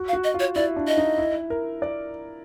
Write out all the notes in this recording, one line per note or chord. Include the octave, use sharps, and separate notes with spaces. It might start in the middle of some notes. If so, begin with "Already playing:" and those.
Already playing: F#4
F5
F#4
D#5
F4
C#5
E4 D5
D4
D#5
D#4
E4
A#4
D5